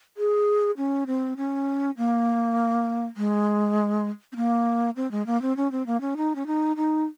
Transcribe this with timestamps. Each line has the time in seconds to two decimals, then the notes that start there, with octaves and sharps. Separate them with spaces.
0.17 G#4
0.77 C#4
1.07 C4
1.37 C#4
1.97 A#3
3.17 G#3
4.32 C4
4.36 A#3
4.96 C4
5.11 G#3
5.27 A#3
5.42 C4
5.57 C#4
5.72 C4
5.86 A#3
6.01 C#4
6.17 D#4
6.35 C#4
6.46 D#4
6.76 D#4